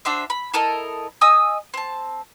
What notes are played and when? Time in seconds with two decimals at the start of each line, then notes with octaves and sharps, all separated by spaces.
0.05 D4 F#4 C5 E5
0.30 B5
0.54 E4 A4 A#4 D#5
1.21 D#5 G#5 D#6 E6
1.74 C4 A5